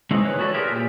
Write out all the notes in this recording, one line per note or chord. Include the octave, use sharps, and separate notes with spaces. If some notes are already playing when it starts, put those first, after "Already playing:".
E3 F#3 G#3 C4 C#4 D#4
B4 C#5
F#4 G#4 A4 B4 C#5 D5
F4 G4 G#4 A#4 B4 E5
A#2 G4